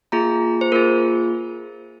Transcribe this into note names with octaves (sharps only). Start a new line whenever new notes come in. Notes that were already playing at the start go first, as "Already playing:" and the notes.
A#3 F4 G#4 A#5
C5
A#3 F4 G#4 A#4